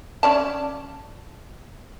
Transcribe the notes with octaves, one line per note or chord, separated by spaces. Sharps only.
C#4 D5 A5